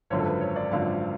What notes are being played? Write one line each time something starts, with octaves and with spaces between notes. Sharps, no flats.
G#1 F#2 D3 F3 C#5
A4
B4
C#5
D5
G#1 F#2 D3 F3 F5